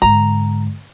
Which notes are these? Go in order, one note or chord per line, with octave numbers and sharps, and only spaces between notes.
G#2 D3 A#5